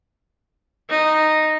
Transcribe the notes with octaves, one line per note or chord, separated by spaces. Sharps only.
D#4